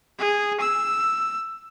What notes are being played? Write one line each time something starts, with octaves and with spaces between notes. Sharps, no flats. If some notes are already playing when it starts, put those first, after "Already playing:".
G#4
E6